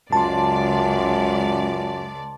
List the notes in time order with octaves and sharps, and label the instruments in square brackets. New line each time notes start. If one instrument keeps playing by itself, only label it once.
[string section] C#2 D5 [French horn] F#2 [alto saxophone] F4 [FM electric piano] A5 C6